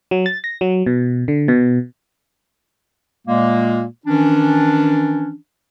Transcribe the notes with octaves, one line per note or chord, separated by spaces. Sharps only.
F#3
A6
A#6
F#3
B2
D3
B2
A#2 G#3 A#3
D#3 E3 C#4 D4